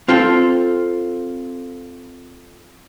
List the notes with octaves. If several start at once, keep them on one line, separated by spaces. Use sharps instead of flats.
C4 F4 A4 G5